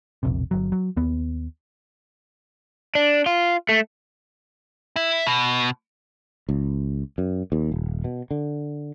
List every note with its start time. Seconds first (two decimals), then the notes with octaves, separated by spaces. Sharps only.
0.23 E1 A#1 C3
0.51 G1 F#3
0.72 F#3
0.97 D#2 B3
2.95 D4
3.26 F4
3.69 A3
4.96 E4
5.27 B2
6.49 C#2
7.18 F#2
7.52 D#2
7.72 D#1
8.04 B2
8.31 D3